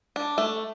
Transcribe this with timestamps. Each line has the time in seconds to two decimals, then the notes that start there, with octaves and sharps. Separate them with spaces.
0.16 D4
0.38 A3